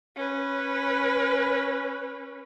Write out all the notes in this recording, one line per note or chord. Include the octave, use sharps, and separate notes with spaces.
C#4 B4